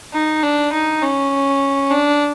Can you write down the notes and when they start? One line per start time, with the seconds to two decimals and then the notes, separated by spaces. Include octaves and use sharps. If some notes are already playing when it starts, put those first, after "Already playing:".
0.14 D#4
0.43 D4
0.72 D#4
1.02 C#4
1.90 D4